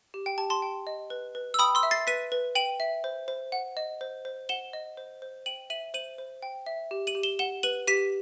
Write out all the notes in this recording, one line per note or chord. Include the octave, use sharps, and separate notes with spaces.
G4
G5
G4 A5
A5 C6
G5
D#5
B4
B4
E6
G5 B5 D#6
C6 E6
E5
A6 C7
B4 B6 D#7
B4
G5 D#7 F#7
E5
C5
C5
F#5
D#5
C5
C5
F#5 E7 G7
D#5
C5
C5
G5 D#7 F#7
E5 D#7 F#7
C5 D#7 F#7
C5
G5
E5
G4
D#7 F#7
G4
E7 G7
F#5 E7 G7
B4 D#7 F#7
G4 B6 D#7